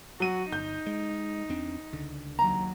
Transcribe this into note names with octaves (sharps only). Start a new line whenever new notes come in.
F#3 F#4 D#7
G1 D#4 G6
G#3
E2 C4 D4
C#2 D3
D#2 F#3 A#5